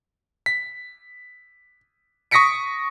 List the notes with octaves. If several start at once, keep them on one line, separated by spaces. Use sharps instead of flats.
B6
C#6 D#6 A#6 B6 C#7 D7